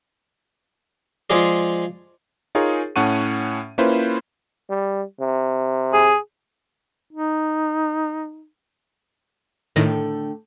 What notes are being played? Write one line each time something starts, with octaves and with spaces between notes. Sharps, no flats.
F3 G#3 F4 G#4 D5
D#4 F4 G#4 A#4 C#5
A2 C#4 F#5 A5 C#6 D#7
A#3 C#4 E4 F4 B4 C5
G3
C3
G#4
D#4
A2 D3 D#3 A3 G5 A#6